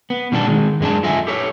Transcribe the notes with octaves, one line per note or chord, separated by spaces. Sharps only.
B3
B2 D#3 G3 D4 E4 A4
D#3 G#3
F#2 G#3 D4 A5
F4 A4 D#5 E5 G#5
G4 A4 C#5